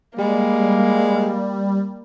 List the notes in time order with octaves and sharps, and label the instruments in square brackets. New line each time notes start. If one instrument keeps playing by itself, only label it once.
[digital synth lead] G3 [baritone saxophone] G#3 [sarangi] A#3